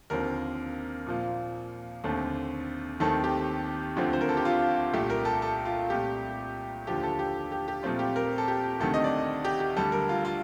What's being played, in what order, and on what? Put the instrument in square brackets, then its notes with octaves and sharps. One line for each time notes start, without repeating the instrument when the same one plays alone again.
[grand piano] D#2 D3 F3 C4 A#4
A#2 F3 A#3
D#2 D3 A3 C4
D#2 D#3 A3 C4 A4
G4
D2 D3 F3 A3 C4
C5
A#4
A4
G4
F4
C2 A#2 A3 G4
A#4
A4
A4
F4
C2 A#2 A3 G4
D#2 D3 F3 G4
A4
G4
G4
G4
A#2 F3 A3 C4 F4
G4
A#4
A4
G4
D2 C3 D#3 A3 A4
D#5
D5
G4
G4
D2 D3 G3 A4
A#4
F4
F4